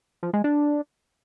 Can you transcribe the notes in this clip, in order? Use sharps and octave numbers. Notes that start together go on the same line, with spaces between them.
F3
G#3
D4